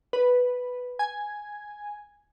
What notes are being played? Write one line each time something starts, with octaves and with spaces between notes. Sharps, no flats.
B4
G#5